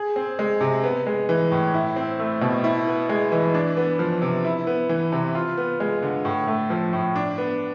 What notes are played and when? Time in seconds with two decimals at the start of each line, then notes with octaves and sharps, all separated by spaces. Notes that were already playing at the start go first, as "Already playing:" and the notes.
Already playing: G#4
0.16 C4
0.39 G#3
0.61 C3
0.84 B3
1.07 G#3
1.29 E3
1.52 A2
1.74 E4
1.96 C4
2.19 A3
2.41 B2
2.64 E4
2.87 B3
3.09 G#3
3.32 E3
3.54 D4
3.77 B3
3.99 F3
4.22 C3
4.45 E4
4.67 B3
4.89 E3
5.12 C3
5.35 F4
5.57 B3
5.80 G#3
6.02 D3
6.25 A2
6.47 A3
6.70 F3
6.93 A2
7.15 D4
7.38 B3